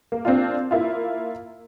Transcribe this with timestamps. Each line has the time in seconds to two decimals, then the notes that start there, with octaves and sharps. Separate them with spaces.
0.12 A#3
0.25 C4 D4 F4
0.71 A#3 E4 F4